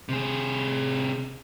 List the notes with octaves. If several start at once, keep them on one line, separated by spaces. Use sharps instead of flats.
C3 G#4